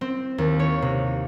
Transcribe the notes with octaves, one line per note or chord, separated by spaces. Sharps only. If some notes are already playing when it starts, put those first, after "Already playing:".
C4
D#2
C#5
C3